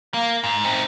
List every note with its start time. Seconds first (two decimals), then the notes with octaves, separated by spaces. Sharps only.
0.14 A#3
0.44 G#2
0.64 C4 D#4